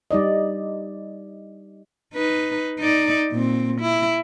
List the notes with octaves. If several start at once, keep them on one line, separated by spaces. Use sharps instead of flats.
G3 D#4 D5 D#5
D#4 B4
D#4 D5
A#2 C4
E4